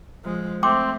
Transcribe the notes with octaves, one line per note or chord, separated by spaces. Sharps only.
F3 G#3
A3 C4 G5 C6 D6